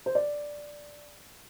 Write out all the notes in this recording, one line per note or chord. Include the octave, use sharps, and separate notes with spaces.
C5
D5